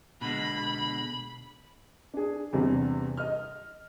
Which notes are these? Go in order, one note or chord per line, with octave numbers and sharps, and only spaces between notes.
B2 D3 G#3 B5
D4 G#4
E2 C3 G3 D4
D#5 F6